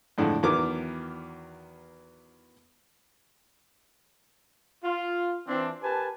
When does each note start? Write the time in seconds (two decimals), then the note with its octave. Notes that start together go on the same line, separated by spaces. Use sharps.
0.18 F2 A2 D3 G#3
0.43 E2 D#3 F#3 B3 A#4 D6
4.84 F4
5.48 E3 C4 D4
5.83 G4 A#4 B4 G#5 A5